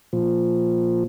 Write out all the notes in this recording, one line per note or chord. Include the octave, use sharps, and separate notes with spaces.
A#2 F3